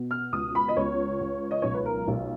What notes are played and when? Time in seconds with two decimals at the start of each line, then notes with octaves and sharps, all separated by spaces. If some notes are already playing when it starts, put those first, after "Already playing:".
Already playing: B2
0.11 F6
0.32 C#2 D#6
0.55 B5
0.68 D#5
0.76 C#2 C#5
1.21 C#2
1.51 D#5
1.62 B1 C#5
1.74 B4
1.86 A#4
2.08 B1